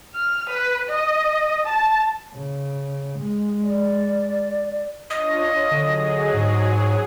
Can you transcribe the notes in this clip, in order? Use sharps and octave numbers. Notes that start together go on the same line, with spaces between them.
F6
B4
D#5
A5
C#3
G#3
D5
D4 F4 C#5 D#5
D3 F#3 G#4
G#2